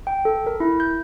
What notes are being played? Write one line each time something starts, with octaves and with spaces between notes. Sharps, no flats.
G5
A4
A#4
E4
G6